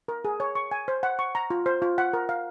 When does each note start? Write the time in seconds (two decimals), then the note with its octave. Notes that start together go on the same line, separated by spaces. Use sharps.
0.08 A#4
0.25 G#4
0.40 C#5
0.55 C#6
0.71 G#5
0.88 C5
1.03 F#5
1.19 C#6
1.35 A#5
1.50 F4
1.66 C5
1.82 F4
1.98 F#5
2.13 A#4
2.29 F5